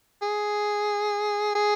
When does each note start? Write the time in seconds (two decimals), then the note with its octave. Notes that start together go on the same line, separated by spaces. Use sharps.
0.22 G#4
1.55 G#4